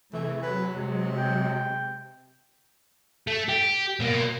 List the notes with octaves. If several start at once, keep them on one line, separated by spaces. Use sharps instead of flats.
C3 E3 A3 G#4
F#3 B4
C3 G#3
G5
A3
G4
B2 A#3